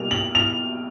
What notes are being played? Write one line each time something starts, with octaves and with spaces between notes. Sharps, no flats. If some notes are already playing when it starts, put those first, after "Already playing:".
Already playing: B2 G3 A#3 F7
F#7
F7